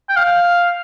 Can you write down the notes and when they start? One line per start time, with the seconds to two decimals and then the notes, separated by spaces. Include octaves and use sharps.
0.09 G5
0.16 F5